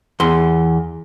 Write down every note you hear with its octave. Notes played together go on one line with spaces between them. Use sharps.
E2 C6